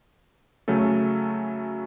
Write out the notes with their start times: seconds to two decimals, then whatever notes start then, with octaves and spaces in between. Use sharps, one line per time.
0.68 C#3 F#3 A3 C#4 A4